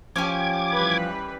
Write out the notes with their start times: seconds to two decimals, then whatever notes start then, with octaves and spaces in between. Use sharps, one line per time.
0.16 F3 C#4 G4 D6 G#6
0.73 E3 G3 B4